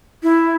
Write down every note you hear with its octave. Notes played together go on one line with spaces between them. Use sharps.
E4